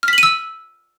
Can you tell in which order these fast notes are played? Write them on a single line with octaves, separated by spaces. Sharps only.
F6 B6 F#7 D#7 E6